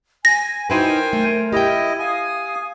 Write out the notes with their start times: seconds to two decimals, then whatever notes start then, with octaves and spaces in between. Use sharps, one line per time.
0.25 G#5 A#6
0.70 D#4 E4 F#4 B4 C5 G5 G#5
0.87 A#4
1.13 A3
1.53 E4 G4 D#5 G5
1.99 F5 G#5 D#6